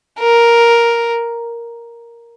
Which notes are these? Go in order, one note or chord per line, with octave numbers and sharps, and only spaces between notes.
A#4